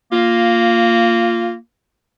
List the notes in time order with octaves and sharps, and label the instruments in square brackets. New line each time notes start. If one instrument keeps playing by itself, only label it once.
[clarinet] A#3 [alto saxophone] F4